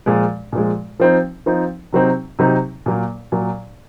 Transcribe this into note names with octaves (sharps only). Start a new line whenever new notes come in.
A#2 F3 G#3
A#2 F3 G#3
F3 C4 D#4
F3 C4 D#4
C3 F#3 C4 D#4
C3 F#3 C4 D#4
A#2 F#3 A#3
A#2 F#3